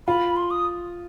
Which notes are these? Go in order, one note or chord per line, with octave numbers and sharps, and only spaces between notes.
F4 B5
C6
D#6